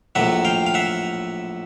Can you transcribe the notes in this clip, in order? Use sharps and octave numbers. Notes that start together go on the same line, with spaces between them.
A#1 A2 F#3 E5 F#5
F5 G5
F5
E5 F#5